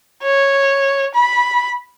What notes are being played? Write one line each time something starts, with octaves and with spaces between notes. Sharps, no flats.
C#5
B5